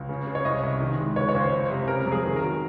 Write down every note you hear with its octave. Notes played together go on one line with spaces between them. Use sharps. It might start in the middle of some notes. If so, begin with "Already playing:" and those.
Already playing: C#2
C#3
C#3
C#5
C2 D#5
C2
D#3
G#3
C#2 C#5
C#5
C#2
C5
F#1
C3
C#3 A#4
A#4
F2
G#4
D#3 A#4
A#4
F#3